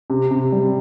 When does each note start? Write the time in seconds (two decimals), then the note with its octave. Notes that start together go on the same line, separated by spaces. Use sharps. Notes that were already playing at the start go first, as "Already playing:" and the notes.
0.10 C3
0.31 C3
0.52 G3